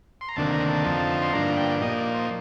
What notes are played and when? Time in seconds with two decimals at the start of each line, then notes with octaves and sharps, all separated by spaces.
0.21 C6
0.29 A#5
0.36 D2 C3 D#3 A#3 D4 A5
0.53 A#5
0.68 A5
0.84 F2 D3 F3 C4 D#4
1.22 C6
1.33 G2 D3 F3 A#3 D4 A#5
1.57 G5
1.81 A#2 F3 A#3 D#4 D#5
1.98 D5
2.14 C5